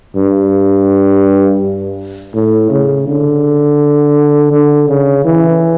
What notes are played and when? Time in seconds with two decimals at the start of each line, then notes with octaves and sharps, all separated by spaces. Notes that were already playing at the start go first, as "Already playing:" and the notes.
0.16 G2
2.34 A2
2.70 C#3
3.07 D3
4.52 D3
4.88 C#3
5.25 E3